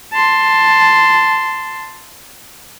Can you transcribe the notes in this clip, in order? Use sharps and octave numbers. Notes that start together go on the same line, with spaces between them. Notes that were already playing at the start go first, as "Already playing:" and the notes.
A5 C6